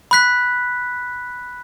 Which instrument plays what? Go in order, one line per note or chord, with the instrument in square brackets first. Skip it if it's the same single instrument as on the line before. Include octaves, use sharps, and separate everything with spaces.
[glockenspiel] B5 F#6 B6